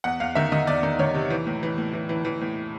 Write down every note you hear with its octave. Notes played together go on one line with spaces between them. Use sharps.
E2 F#5
E2 F5
D#3 E5
D#3 D#5
E2 D5
D#3
D#3 C#5
C3
E3
A2
E3
A2
E3
E3
E3
A2